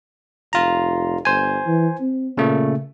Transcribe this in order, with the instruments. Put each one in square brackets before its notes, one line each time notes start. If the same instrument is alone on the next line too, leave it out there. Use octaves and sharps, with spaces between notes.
[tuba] F1 [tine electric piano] F4 A#5
[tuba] G1 [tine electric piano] C5 G#5
[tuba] E3
C4
[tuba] A#2 [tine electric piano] C#3 A3